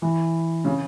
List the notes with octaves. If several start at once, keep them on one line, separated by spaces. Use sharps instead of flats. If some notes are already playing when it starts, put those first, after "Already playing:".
E3
C#3